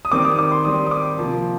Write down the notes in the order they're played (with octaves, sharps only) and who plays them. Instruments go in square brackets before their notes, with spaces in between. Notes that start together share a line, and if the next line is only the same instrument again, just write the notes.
[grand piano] D#6
D#3 G3 C4 D6
D#6
D6
C6
D#3 G3 C4 D#6
D#6
D6
C3 F3 A#3